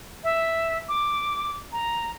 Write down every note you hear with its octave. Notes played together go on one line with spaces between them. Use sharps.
E5
D6
A#5